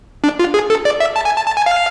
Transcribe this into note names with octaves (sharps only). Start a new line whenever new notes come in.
D4
F4
G#4
A4
D5
E5
A5
G#5
A5
A5
G#5
F5